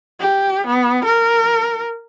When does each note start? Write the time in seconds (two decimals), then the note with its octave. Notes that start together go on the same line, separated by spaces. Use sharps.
0.20 G4
0.67 B3
1.04 A#4